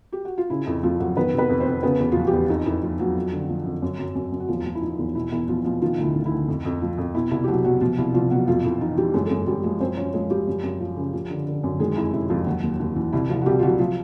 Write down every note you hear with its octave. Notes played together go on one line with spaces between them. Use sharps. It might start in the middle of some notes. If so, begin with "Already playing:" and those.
G4
F#4
F4
C#3 E4
F2 E4
F2 F3 F4
F2 F#3 F#4
D#3 B3 B4
C3
B3 B4
F2
C4 C5
F2
C#3 B3 B4
E2
F4
F3 F#4
G3 G4
E2
F2 D#4
F2 E4
F3 F4
F3 F#3 F#4
F2
D3
F3
F2
F#2
F#2
F#2
F#2
F#4
E2 F3 F4
F3
E4
F3 D#4
E2
B2 E4
E2 E4
B2 F3 F4
B2 F3 F4
D#3 F3 F4
D2
E4
D#3
E4
D2
F2
F2
F3
F2
B2 E4
C2 E4
G4
C2 F#3 F#4
B2 F#3 F#4
B2 F3 F4
C2 E4
C2 F3 F4
B2 F#3 F#4
F2 F3 F4
F2 E4
E3 D#4
E3 G3 G4
F#2 G#3 G#4
A4
F#2 G#3 G#4
F#2 G3 G4
F3 G#3 G#4
F#2 C4 C5
F3 C#4 C#5
F3 G#3 G#4
F3 G3 G4
F#2
F#2
F3
C#3
F3
D3
D3
F#2
D#3 G#3 G#4
F2 E4
C3 E4
F2 F3 F4
D#2 F#3 F#4
D#2
D#2
E3
C2 E4
C2 F3 F4
F#4
C2 G3 G4
F4
C2 F#3 F#4
F3 F4